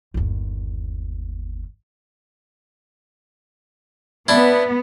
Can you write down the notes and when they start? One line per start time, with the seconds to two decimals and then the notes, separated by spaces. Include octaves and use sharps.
0.14 G1 D#2
4.28 B3 D4 E4